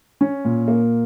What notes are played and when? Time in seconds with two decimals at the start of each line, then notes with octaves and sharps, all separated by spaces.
0.21 C#4
0.45 A#2
0.68 A#3